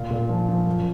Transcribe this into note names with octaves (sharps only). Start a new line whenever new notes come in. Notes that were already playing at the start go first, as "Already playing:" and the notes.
Already playing: A#2 F4
A#2
F3
F3
F#2